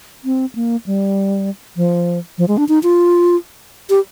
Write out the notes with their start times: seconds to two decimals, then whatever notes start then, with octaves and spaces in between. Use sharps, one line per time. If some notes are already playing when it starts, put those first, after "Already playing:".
0.24 C4
0.55 A#3
0.86 G3
1.76 F3
2.38 F3
2.48 G#3
2.58 D4
2.68 D#4
2.83 F4
3.90 G4